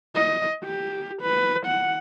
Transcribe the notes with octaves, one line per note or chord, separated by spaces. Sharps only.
D#5
G4
B4
F#5